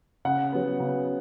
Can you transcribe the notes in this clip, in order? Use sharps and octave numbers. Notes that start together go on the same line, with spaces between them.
C#3 F#5
F#3 B3
C#3